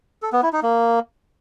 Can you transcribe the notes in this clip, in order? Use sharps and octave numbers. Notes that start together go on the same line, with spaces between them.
A4
B3
E4
D#4
A#3